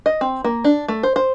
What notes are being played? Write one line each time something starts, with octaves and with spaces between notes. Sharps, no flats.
D#5
C4
A#3
D4
A3
C5
C5